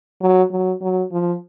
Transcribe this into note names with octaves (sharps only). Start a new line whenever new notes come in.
F#3
F#3
F#3
F3